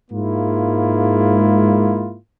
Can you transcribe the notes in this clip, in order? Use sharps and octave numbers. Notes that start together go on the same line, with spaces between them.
G#2 G#3 A#3 E4 F4